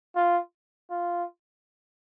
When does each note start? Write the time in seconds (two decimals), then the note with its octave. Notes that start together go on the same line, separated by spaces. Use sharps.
0.16 F4
0.90 F4